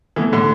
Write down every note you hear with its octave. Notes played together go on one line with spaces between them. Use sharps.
B2 E3 A3
A2 D3 A3